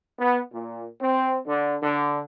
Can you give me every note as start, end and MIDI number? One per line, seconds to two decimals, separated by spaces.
0.19 0.40 59
0.52 0.85 46
1.00 1.37 60
1.47 1.75 50
1.81 2.21 50